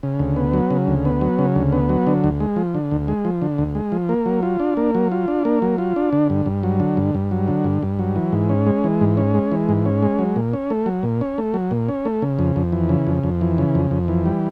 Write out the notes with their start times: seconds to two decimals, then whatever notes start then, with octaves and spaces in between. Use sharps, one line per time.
0.03 C#3
0.19 D2
0.36 B3
0.53 F#3
0.71 C#3
0.87 D2
1.05 B3
1.21 F#3
1.39 C#3
1.56 D2
1.72 B3
1.89 F#3
2.07 D3
2.24 D2
2.40 G#3
2.56 F3
2.75 D3
2.91 D2
3.08 G#3
3.25 F3
3.42 D3
3.58 D2
3.75 G#3
3.92 F3
4.09 A#3
4.26 F#3
4.43 F4
4.60 D4
4.77 A#3
4.95 F#3
5.12 F4
5.28 D4
5.45 A#3
5.62 F#3
5.78 F4
5.96 D4
6.13 D3
6.30 G2
6.46 G2
6.63 F#3
6.80 D3
6.97 G2
7.15 G2
7.31 F#3
7.48 D3
7.64 G2
7.83 G2
7.99 F#3
8.16 E3
8.33 G#2
8.49 C#4
8.67 G#3
8.84 E3
9.01 G#2
9.17 C#4
9.34 G#3
9.52 E3
9.69 G#2
9.86 C#4
10.02 G#3
10.19 F#3
10.36 A#2
10.53 C#4
10.70 A3
10.86 F#3
11.03 A#2
11.21 C#4
11.38 A3
11.54 F#3
11.71 A#2
11.89 C#4
12.05 A3
12.22 C#3
12.39 F2
12.56 F2
12.72 E3
12.89 C#3
13.07 F2
13.24 F2
13.41 E3
13.58 C#3
13.75 F2
13.91 F2
14.08 E3
14.26 G3